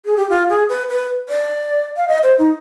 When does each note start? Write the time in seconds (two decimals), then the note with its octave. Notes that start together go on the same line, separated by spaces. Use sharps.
0.05 G#4
0.17 G4
0.29 F4
0.49 G#4
0.69 B4
0.89 B4
1.29 D5
1.96 F5
2.08 D#5
2.23 C5
2.38 D#4